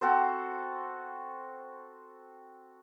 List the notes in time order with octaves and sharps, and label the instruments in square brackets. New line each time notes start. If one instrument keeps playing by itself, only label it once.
[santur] C4 F#4 A4 C5